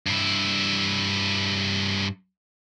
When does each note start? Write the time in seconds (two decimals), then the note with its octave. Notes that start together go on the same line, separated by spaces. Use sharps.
0.07 G2 E4